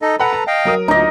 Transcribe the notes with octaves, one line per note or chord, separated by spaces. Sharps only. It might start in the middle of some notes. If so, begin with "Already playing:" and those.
D#4 A4 D#5
A4 B4 F#5 A#5 B5
A5
D#5 F5 G5
F#3 A#4 D#6
D2 D#4 D#5